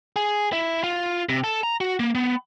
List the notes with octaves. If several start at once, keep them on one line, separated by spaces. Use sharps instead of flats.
G#4
E4
F4
C3
A4
A#5
F#4
A#3
B3